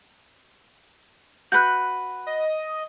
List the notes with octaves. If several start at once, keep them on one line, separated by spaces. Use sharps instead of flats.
F#4 B4 F#6 G6
D#5